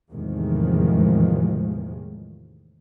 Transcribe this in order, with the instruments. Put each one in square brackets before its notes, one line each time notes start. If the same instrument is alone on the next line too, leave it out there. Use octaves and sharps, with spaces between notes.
[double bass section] E2 A2 C3 D#3 F3 G#3